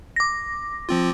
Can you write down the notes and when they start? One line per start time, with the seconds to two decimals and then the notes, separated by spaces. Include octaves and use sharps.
0.16 D6 A#6
0.89 F3 C4 F4